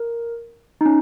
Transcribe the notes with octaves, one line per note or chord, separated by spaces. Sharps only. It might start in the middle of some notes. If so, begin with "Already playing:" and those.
Already playing: A#4
D#4
C#4